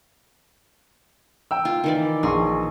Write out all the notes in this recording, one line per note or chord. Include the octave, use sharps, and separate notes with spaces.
G5 E6
F4
D#3 E3 D5
A#1 G#4 C6 C#6